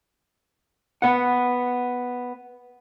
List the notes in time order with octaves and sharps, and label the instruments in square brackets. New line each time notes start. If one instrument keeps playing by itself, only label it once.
[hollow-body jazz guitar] B3 F#5